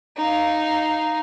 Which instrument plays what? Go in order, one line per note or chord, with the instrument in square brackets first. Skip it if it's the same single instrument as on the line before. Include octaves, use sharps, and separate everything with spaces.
[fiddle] D#4 F5